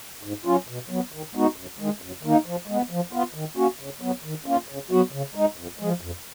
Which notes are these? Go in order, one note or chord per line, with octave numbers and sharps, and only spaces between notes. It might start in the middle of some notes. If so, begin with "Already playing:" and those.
G#2
F#3 C#4 F4
B2
F#3 B3
D#3
G#3 B3 D#4 F#4
F#2
D#3 G#3
F#2
D#3 A#3 D#4
F3
G#3 B3
F3
B3 F4
D#3
A#3 C#4 F#4
C#3
F#3 B3
D#3
A#3 C#4 F4
C#3
F#3 B3 F#4
C#3
G#3 D#4
F2
F3 G#3
F2